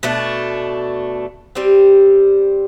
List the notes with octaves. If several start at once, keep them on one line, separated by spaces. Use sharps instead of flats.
B2 A3 D4
G3 C4 G4